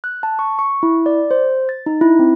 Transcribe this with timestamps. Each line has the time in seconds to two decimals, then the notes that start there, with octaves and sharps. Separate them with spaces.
0.04 F#6
0.23 A5
0.39 C#6
0.59 C#6
0.83 E4
1.06 D5
1.31 C5
1.69 A6
1.86 D#4
2.01 E4
2.19 C4